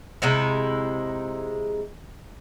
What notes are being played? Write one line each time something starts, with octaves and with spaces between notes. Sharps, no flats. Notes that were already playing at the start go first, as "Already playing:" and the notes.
C3 G#3 D#4 E4